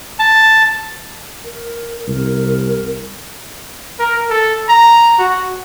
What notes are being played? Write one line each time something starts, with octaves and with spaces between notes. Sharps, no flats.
A5
A#4
C2 A#4
A#4
A4
A#5
F#4